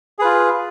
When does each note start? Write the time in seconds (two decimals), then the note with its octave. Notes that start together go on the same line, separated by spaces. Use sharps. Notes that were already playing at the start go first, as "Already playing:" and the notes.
0.19 G#4
0.22 B4
0.24 F4